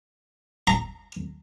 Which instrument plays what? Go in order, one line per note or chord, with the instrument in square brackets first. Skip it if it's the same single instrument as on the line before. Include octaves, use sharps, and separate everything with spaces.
[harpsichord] A#5